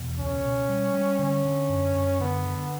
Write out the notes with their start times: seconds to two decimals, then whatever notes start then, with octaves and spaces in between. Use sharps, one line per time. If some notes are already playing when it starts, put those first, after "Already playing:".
Already playing: E2 B2
0.18 C#2 C#4
0.43 B2
0.69 G3
0.94 G3
1.19 D3 C#4
1.45 D3
1.69 F#2
1.95 F#2
2.20 D3 B3
2.46 D3